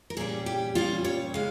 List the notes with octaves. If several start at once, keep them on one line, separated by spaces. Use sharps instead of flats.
A#4
A#2 G3 C#4 G#4
G4
A#2 G3 C#4 F4
C#5
C#3 G#3 F5